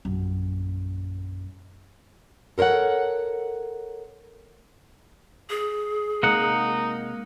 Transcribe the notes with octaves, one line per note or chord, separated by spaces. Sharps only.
A#1 F#2
A4 A#4 C5 C#5 F#5
G#4
C3 G#3 A#3 D#4 F#5